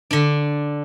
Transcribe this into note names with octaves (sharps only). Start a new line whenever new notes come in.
D3 D4